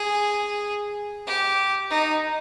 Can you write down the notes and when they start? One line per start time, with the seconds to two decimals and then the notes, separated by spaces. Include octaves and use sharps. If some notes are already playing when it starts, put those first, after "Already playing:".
Already playing: G#4
1.28 G4
1.90 D#4